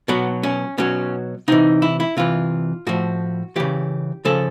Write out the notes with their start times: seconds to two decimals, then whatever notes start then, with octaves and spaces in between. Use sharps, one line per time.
0.08 B2 F#3 B3
0.43 C#4
0.78 B2 F#3 C#4
1.48 C3 E3 D#4
1.82 E4
2.00 E4
2.17 C3 E3 F4
2.87 A2 F3 F#4
3.56 C#3 E3 G4
4.25 C#3 F3 A4